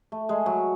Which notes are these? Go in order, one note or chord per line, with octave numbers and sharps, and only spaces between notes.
A3
G#3
F#3